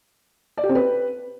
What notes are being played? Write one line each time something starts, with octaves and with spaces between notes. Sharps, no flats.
D5
G4
C4
B4